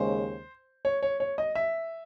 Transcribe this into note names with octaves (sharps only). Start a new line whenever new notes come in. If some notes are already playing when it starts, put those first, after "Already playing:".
Already playing: D#2 C#3 G#3 C5
C#5
C#5
C#5
D#5
E5